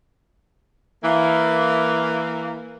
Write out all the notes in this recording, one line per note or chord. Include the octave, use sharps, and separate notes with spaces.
E3 A#3